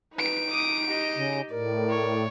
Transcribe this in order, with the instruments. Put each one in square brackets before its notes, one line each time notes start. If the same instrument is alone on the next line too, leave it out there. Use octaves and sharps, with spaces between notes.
[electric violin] D#4 D7 [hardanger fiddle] B4
[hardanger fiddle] D6 D#6
G4 D#5
[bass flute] C#3
[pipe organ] A2 [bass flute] A#4 [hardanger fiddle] D5
[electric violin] C#5